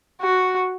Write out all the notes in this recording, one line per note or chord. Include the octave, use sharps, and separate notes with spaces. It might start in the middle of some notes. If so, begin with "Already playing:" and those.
F#4